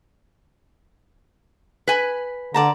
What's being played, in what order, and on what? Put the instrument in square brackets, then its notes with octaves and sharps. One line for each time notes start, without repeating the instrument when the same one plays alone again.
[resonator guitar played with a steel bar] B4 G#5
[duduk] D3 [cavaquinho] D5 A5 A#5